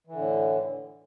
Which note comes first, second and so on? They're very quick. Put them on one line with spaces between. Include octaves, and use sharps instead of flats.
E3 D3 A2